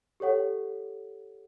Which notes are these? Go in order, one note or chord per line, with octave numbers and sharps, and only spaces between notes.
G4 A4 C#5 F#5